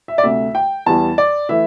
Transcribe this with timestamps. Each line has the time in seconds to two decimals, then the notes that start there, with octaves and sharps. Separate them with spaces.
0.08 E5
0.18 D5
0.23 D2 C3 A3 E5
0.55 G5
0.86 E2 E3 G3 A5
1.18 D5
1.49 E3 A3 E5